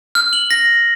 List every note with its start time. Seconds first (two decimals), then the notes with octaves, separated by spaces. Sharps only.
0.15 F6
0.33 F#7
0.51 A#6